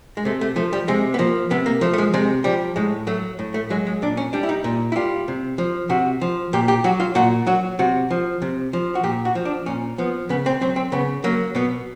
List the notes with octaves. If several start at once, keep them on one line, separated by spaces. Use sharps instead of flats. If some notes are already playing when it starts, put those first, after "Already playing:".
G#3
C3 A3
A3
F3 A3
G3
C3 G#3
B3
F3 A#3
C3 B3
A#3
F3 A3
A3
G#3
C3 G#3
F3 G3
A2 G#3
F#3 A3
A2
A3
F#3 G#3
G#3
A#2 D4
C#4
G3 D4
E4
D#4
A#2
E4
G3 F4
C3
F3
C3 F#4
F3
A#2 G4
G4
F#3 F#4
F4
A#2 F#4
F#3 F#4
C3 F#4
F3
C3
F3
F#4
A#2 G4
F#4
F3
D4
A#2 C#4
F3 B3
C#3 B3
C4
F#3 C4
C4
C#3 B3
F#3 A#3
B2 B3